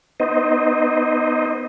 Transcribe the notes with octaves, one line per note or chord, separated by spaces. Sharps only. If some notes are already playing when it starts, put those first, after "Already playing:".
B3 D#4 C5 D#5